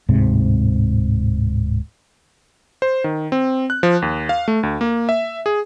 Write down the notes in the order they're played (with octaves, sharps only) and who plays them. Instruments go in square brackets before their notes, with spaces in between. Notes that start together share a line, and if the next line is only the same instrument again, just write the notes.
[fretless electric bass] D1 G#2 C3
[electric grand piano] C5
D#3
C4
F#6
F3
D#2
F5
A3
D2
A#3
E5
G#4